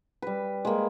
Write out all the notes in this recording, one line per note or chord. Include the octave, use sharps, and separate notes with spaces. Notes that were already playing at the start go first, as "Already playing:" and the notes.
G3 B4
G#3 A#3